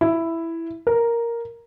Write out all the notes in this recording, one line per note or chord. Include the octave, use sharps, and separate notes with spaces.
E4
A#4